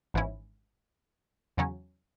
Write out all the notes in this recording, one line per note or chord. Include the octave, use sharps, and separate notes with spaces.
G#1 G#2 E3 C#4 E4
E2 C#3 F#3 C#4